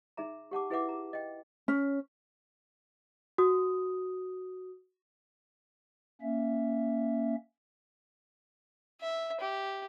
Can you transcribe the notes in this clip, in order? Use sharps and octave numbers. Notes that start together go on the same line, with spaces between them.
D#4 G#4 E5 A#5
G4 F#5 A5 D6
E4 G#4 B4 E5 F#5 D6
A#5
D#5 G5
C#4
F#4 D#6
A#3 C#4 E5
E5
G4